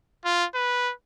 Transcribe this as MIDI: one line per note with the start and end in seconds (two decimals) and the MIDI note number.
0.25 0.46 65
0.55 0.93 71